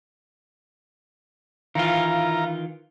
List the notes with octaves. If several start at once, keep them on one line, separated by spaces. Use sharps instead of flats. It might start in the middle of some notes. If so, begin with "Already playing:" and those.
D#3 E3 E4 F4 F5 A#5